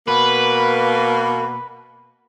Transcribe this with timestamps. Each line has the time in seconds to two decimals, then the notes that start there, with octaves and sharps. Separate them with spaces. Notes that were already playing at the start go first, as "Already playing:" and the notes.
0.08 B2 A#3 B4